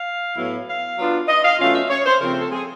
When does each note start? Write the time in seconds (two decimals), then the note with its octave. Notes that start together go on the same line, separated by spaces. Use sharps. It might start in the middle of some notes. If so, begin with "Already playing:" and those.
Already playing: F5
0.37 A2 F#3 B3 E4
0.67 F5
0.98 F#3 B3 D4 F4
1.28 D#5
1.44 F5
1.59 B2 F#3 A3 C#4 F4 F5
1.75 E5
1.90 C#5
2.06 C5
2.21 C#3 F3 A3 C4 A#4
2.37 A4
2.52 G#4